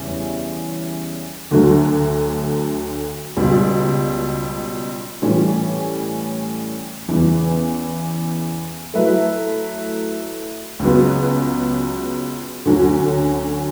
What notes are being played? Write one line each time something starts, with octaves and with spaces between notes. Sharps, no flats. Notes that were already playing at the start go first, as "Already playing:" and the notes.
Already playing: E2 C#3 G3 C#4 E4
D2 D3 F#3 A3
C#2 B2 G3
A2 E3 G3 C#4 G4
E2 C#3 E3 B3
F#3 A3 E4 B4 E5
C#2 C#3 F#3 B3
D2 D3 F#3 C#4 F#4